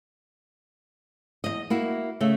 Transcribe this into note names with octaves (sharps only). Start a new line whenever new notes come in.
E2 D#3 D#5
A#3 E4 F#4
C#3 A3 E5